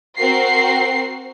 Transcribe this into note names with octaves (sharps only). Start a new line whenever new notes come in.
C4 F#4 A#4 C7